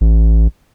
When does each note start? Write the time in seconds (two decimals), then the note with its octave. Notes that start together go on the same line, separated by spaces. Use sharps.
0.01 A1